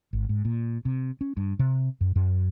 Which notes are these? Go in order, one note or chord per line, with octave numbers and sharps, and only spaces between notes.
G#1
G#2
A#2
C3
C#4
G2
C3
F#2
F#2